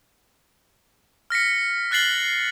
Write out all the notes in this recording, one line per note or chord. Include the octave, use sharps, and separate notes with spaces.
F6 A#6 B6 C#7
F6 F#6 A6 C7 F#7 G7